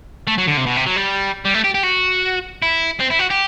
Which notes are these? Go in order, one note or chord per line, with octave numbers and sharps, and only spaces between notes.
A3
F#3
D3
C3
B2
C3
F#3
G3
G3
A3
G4
G4
F#4
E4
C4
E4
F#4
G4